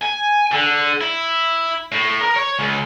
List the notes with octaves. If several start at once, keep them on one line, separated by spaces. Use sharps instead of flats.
G#5
D3
E4
A2
A#4
C#5
C#2